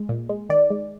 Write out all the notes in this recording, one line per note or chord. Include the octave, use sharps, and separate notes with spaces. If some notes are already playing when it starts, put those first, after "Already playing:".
Already playing: G#3
A#2
G#3
D#3 D5
G#3